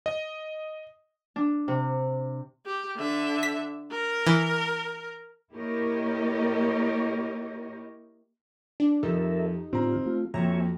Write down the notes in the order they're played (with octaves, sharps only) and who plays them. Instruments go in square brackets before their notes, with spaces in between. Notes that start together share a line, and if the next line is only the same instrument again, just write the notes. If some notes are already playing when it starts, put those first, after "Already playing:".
[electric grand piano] D#5
[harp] D4
C3
[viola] G4
D3 E5
[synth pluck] B6
[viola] A#4
[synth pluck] E3
[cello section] A#3 E4 G4 A#4 C#5 D#5
[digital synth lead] D4
[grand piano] F2 [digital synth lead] D#4 [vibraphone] G4 [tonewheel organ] A4 A#4 E5
[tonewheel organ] A2 D3 F4 [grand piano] C4 A#5
[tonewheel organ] A3 F4
[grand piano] F2 [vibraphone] A#3 F#4 G5 [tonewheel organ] C#5 E5 G#5 [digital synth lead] A#5